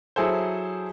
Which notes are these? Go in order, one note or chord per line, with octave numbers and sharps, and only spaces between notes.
F#3 E4 G#4 A4 C5